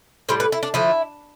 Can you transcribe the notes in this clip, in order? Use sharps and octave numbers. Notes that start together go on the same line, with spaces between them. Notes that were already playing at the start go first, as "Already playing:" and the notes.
A2 G3 C5
B4
E4
D4
D3 F3 A3 E4